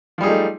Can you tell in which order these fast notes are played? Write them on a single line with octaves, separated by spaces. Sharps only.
F3 G3 G#4 D#4 A3